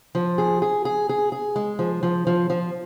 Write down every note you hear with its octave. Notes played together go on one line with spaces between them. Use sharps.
F3
G#4
G#4
G#4
G#4
G#4
G#3
F3
F3
F3
F3